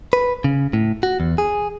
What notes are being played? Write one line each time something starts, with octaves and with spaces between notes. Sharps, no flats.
B4
C#3
A2
F#4
E2
G#4